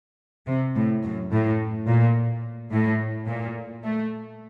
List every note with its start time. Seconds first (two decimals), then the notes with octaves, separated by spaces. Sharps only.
0.48 C3
0.76 A2
1.04 F#2
1.32 A2
1.87 A#2
2.72 A2
3.28 A#2
3.84 A3